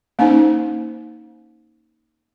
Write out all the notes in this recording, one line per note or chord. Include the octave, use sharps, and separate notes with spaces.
A#3 C#4 D#4 C5